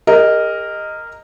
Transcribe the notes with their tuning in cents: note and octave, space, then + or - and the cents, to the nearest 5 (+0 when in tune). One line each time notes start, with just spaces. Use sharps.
G4 +45 A#4 -10 D#5 +0